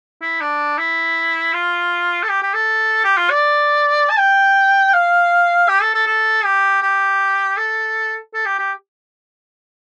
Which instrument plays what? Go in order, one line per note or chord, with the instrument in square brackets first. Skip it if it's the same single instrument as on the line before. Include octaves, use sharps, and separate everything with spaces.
[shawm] E4
D4
E4
F4
A4
G4
G4
A4
G4
F4
D5
A5
G5
F5
G4
A4
A4
A4
G4
G4
A4
A4
G4
G4